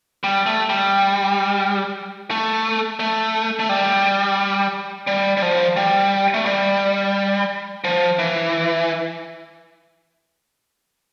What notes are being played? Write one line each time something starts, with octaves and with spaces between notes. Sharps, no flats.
G3
A3
G3
A3
A3
A3
G3
G3
G3
F3
G3
A3
G3
F3
E3